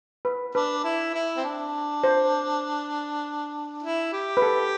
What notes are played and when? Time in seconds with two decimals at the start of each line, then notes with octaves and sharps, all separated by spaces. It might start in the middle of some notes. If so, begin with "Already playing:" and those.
0.25 B4
0.55 D4 B4
0.84 E4
1.14 E4
1.37 C4
1.44 D4
2.04 C5
3.83 E4
4.13 G4
4.37 B4
4.42 A4